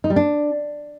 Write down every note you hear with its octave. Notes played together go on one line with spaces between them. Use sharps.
D#4
G3
D4